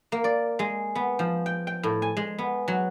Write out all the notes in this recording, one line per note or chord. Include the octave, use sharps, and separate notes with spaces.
A#3
D5
G#3
B3
F3
G5
G5
A2
G#5
G#3
B3
F#3